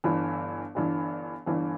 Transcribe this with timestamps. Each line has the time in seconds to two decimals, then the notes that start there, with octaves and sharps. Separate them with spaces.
0.04 G1 G2 E3
0.75 G1 G2 E3
1.46 G1 G2 E3